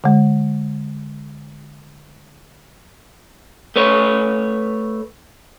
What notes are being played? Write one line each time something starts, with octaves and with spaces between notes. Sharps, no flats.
D3 G#3
A3 B4 C#5